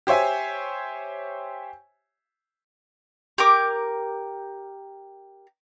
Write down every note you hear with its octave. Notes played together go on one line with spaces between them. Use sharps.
G4 C5 C#5 E5 G#5
G4 A#4 D6